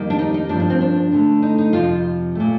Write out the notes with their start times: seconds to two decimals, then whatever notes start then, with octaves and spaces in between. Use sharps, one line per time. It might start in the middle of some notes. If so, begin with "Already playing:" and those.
Already playing: F2 D#3 G3 A#3
0.10 D4
0.19 D#4
0.34 D#4
0.49 G2 F3 A#3 D4
0.60 D4
0.70 C4
0.81 D4
1.12 D2 D3 A3
1.42 D#4
1.58 D#4
1.73 F2 C3 F3 F4
2.35 A#2 A3